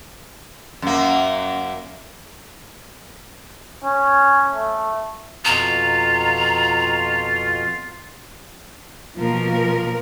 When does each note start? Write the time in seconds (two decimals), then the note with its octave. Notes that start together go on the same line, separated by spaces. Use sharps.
0.82 F#2 A#3
3.85 C#4
4.54 A3
5.45 F2 B2 F4 A#5
9.17 B2 F3 A#3 A#4